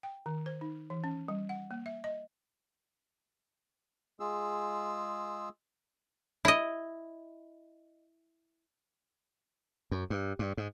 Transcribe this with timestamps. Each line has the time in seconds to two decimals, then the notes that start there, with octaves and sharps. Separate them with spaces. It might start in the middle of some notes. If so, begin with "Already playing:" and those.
0.03 G5
0.26 D#3
0.46 C5
0.61 D#4
0.90 E3
1.04 C#4
1.28 G3
1.49 F#5
1.71 A#3
1.86 E5
2.04 D#5
4.20 G#3 F4 G#4 E6
6.45 E4 D#5
9.91 F#2
10.10 G2
10.39 G2
10.57 G#2